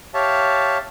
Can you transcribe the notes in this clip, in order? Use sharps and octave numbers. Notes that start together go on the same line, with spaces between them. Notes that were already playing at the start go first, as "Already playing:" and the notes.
G4 C#5 E5 F5 A5